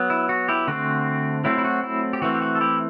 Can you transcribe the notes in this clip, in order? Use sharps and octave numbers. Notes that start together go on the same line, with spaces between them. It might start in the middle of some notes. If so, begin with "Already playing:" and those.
Already playing: F#3 B3
E4
F#4
E4 G4
D3 A3 C4 F#4
F#3 A3 C4 E4
E4
F#4
E4
G4
E3 A3 C4 F#4
G4
F#4
A4
E4 G4